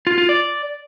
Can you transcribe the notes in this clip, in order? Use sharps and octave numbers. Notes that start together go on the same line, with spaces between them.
F4
F4
D5